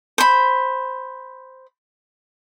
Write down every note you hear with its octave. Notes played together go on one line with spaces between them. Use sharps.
C5 B5